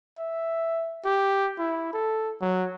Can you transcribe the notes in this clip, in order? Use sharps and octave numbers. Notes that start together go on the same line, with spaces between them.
E5
G4
E4
A4
F#3